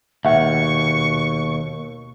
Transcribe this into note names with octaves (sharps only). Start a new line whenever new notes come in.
D#2 B2 E5 F#5 C#6